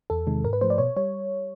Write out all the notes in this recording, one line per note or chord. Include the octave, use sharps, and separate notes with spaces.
E2 A4
C3 D#3 G#3
G#2 A#4
B4
F3 A3 C5
D5
B2 C#5
G3 C#5